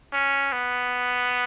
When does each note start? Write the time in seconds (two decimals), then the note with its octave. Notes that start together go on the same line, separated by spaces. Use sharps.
0.13 C#4
0.52 B3